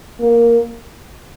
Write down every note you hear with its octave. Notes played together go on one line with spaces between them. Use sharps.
A#3